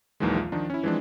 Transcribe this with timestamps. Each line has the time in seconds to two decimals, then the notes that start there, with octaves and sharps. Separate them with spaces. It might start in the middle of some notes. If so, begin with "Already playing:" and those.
0.20 A#1 D#2 D#3 E3 F#3 G#3
0.37 F4
0.52 D#3 F3 D4 D#4
0.70 C#4 E4
0.83 E3 F3 G#3 C4 D4